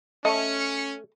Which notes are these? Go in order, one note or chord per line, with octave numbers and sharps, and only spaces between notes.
A3 C#4 D#5 C#7